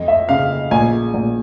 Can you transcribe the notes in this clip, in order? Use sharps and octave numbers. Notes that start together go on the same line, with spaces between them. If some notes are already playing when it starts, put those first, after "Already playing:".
Already playing: F2 D#5
E5
C#3 F5
A#1 G#5
A#1